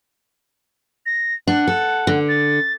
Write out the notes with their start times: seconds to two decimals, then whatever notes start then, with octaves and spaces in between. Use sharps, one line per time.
1.06 A#6
1.47 D4 F#5
1.67 A4
2.07 D3
2.29 A6